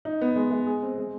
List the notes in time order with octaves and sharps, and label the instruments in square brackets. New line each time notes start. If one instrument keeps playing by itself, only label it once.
[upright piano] D#4
B3
G#3
G#3
G#4
C4
G#3